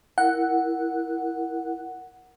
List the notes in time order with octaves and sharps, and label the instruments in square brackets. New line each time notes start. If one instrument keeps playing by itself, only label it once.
[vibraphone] E4 A#4 [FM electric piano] F#5